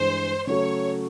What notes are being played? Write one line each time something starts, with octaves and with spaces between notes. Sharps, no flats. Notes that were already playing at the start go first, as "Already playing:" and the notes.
Already playing: G2 E3 G#3 C5
C#3 F#3 A3 C#5